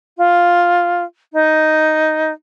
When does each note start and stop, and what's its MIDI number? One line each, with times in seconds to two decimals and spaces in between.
0.17 1.04 65
1.33 2.32 63